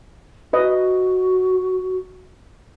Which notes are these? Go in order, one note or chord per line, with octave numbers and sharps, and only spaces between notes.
F#4 B4 D#5